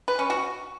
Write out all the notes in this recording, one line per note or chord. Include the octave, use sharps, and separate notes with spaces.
B4
C#4
F#4